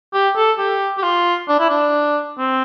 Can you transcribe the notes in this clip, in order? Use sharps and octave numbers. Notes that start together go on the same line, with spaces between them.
G4
A4
G4
G4
F4
D4
E4
D4
C4